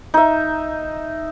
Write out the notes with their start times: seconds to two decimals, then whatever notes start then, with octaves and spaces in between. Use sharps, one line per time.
0.14 D#4 E5